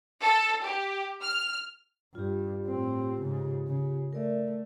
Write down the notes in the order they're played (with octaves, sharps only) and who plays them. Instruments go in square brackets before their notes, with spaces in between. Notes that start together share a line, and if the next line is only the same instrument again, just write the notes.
[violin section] A4
G4
F6
[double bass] G2 [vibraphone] F4 G4
[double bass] A2 C4
G#2 C#3
C#3
[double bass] A3 [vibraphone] A#4 D5 E5